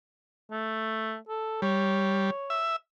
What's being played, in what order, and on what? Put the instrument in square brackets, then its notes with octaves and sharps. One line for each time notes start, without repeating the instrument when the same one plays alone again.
[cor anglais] A3
A4
[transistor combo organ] G3 [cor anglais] C#5
[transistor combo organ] E5